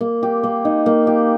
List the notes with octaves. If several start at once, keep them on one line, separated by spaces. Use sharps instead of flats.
A#3
G4
A#3
D#4
A#3
G4